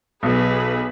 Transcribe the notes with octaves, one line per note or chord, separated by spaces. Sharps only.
B1 G#4 B4